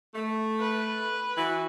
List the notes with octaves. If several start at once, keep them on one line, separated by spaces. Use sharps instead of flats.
A3
B4
E3 E4 F#4